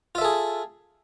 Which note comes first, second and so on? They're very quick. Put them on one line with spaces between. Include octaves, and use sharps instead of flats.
F4 E5 A4 G#4